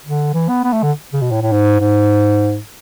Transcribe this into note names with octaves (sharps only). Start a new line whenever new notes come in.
D3
E3
B3
B3
A3
D3
C#3
B2
A2
A2
G#2
G#2